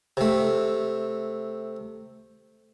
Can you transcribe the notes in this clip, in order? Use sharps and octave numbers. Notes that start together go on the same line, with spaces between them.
C3 A3